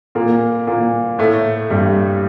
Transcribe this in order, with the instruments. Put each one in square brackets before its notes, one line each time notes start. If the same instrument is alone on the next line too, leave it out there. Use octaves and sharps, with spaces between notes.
[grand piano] A#2 A#3
A#2 A#3
A2 A3
G2 G3